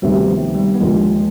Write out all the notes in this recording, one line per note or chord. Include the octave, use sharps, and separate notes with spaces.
D2 C3 D#3 G3 B3
G3
F3
G3
B3
D#2 D3 F3 G#3